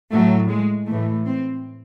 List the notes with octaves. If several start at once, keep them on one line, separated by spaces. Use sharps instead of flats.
A2 F#3 A3
G#3
A2 E3 A3
C4